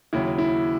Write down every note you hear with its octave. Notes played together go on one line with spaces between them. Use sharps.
D#2 C#3 F#3 E4
E4